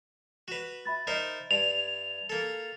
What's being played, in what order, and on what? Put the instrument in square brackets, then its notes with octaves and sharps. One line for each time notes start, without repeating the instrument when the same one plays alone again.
[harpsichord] F#4 B4 [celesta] E7 F7
[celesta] E5 B5 A6
[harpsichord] D#4 A#4 C5
[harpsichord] G2 [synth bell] F7
[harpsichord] A#3 A4